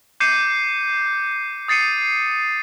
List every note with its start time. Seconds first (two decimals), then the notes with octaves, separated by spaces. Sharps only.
0.20 D6 G6 C7 C#7 D#7
1.68 D#6 A6 C7 C#7 D#7